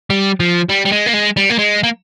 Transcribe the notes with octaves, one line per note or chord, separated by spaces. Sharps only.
G3
F3
G3
G3
G#3
A#3
G#3
G3
A#3
G#3
A#3